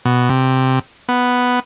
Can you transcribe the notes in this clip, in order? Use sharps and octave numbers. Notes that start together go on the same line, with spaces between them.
B2
C3
B3